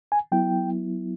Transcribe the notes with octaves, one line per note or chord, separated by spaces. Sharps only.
G#5
F#3 B3 E4 G5